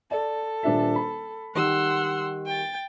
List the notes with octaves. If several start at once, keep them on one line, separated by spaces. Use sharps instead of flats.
A4 D5
D#1 D4 E5
B5
D#3 G3 F#5 C6 E6
G5 A6